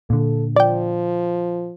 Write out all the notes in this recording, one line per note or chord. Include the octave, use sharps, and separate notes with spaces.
A#2 D3 A4
F3 D5 G5